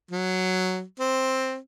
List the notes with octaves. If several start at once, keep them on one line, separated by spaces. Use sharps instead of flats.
F#3
C4